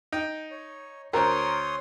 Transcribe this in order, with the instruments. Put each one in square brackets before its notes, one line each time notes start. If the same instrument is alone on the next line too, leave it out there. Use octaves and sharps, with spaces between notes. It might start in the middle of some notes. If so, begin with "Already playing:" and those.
[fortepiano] D#4 G5
[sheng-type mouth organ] C#5
[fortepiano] D2 C5 [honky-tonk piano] A#4 [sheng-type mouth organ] C#5 C6 D#6